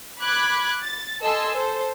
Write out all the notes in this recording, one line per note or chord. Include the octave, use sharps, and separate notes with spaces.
B5 D6 F#6 G#6
A6
A4 D#5 G#5 A5 C6 E6
A4 C5